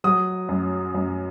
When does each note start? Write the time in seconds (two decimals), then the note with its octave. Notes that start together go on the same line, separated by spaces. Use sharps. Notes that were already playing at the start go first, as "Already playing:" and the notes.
0.04 F#3 D#6
0.49 F#2
0.94 F#2